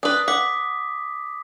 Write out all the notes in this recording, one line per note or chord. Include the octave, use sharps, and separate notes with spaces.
D4 B4 D#6
F#5 D6 B6